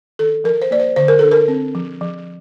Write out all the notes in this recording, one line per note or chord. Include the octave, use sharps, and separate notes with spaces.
D#3 A4
F3 A#4
C5
A#3 D5
C5
D3 C5
A#4
D4 A4
A#4
C4
F3
F3